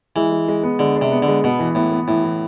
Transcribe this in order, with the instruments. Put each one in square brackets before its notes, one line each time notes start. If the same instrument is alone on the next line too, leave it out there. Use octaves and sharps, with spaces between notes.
[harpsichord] E3 [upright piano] G#3
[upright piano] G#3
G#3
B3
[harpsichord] D3 [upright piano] G#3
[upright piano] D4
[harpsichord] C3
[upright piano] B3
[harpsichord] D3
[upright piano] G#3
[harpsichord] B2 [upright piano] B3
[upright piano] E3
[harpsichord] A2 [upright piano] B3
[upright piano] B3
[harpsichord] A2 [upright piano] E3
[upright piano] E3